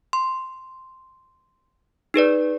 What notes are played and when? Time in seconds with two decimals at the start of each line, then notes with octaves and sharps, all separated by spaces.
0.13 C6
2.14 D#4 G#4 B4 D5